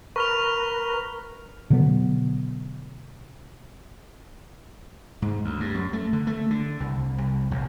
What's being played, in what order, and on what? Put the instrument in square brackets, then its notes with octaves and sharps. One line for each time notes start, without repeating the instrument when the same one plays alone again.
[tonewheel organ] A#4 B4 [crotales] C#6 F6 F7
[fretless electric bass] B2 D3 F#3 B3
[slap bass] G#2
D2
G2
F#2
A3
D3
A3
D3
C2
C2
A#1